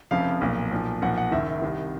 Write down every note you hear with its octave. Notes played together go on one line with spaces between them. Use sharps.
F1 F2 C#3 F3 F5
B1 A#2 F3
B1 A#2 F3
B1 A#2 F3 F#5
F#5
F#1 F#2 D#3 E5
C2 C3 D#3